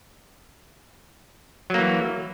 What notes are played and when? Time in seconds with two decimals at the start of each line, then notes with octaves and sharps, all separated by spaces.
1.70 F#3
1.74 A#3
1.79 E3